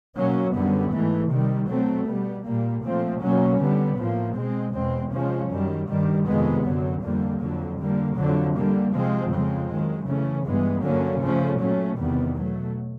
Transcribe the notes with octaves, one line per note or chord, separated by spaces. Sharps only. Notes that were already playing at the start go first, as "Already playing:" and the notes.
B2 F#3 A#3 C#4
F#2 D3 G3 B3
G#2 E3 A3
C3 D#3 G3
B2 F#3 A3 C4
B2 G3 B3
A#2 G3 A#3
A#2 F3 A3 C4
B2 F#3 A#3 C#4
D3 G3 B3
A2 F3 A#3
B2 G#3 C4
E2 B2 G#3 C4
C3 F3 G#3 C#4
F#2 D#3 G3
G2 D#3 G3
F2 C3 D#3 G#3 B3
F#2 D3 F#3
F2 D3 G3 A#3
F2 D3 F#3
D3 G3 A#3
F2 D3 F#3
D3 G3 A#3
C3 F3 G#3 C4
F2 C#3 F3 G#3 C4
F#2 D#3 G#3
C#3 E3 A3 C#4
G2 E3 G#3 B3
G2 D3 F#3 A#3 C#4
C#3 F3 A3 C#4
A#2 F#3 A3 C#4
E2 C3 D#3 G3 B3
B2 F#3 A3